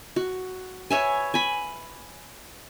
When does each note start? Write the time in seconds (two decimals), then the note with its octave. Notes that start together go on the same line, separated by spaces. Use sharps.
0.16 F#4
0.90 B4 C#5 E5 G#5
1.34 G#5 B5